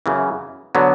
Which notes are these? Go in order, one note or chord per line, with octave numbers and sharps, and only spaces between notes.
F#2 C#3 E3
D3 F#3 B3